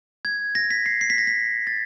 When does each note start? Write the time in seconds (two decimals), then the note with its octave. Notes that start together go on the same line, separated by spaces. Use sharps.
0.25 G#6
0.55 A#6
0.71 B6
0.86 C7
1.01 C7
1.10 B6
1.18 A#6
1.27 B6
1.67 A6